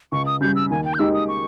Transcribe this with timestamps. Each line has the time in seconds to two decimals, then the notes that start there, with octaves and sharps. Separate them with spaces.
0.12 C#2 C#6
0.26 D#6
0.41 C#3 G3 G6
0.56 E6
0.70 D#2 G#5
0.85 G5
0.94 G6
0.99 D#3 G#3 D#4 G4 E6
1.14 D#6
1.28 C#6